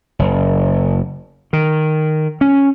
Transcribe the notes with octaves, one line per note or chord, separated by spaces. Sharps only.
F#1
D#3
C#4